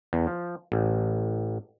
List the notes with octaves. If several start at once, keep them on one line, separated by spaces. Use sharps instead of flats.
E2
F3
A1